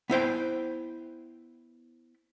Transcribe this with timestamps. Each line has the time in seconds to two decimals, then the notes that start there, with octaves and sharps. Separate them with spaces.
0.10 B3 E4 C5 G5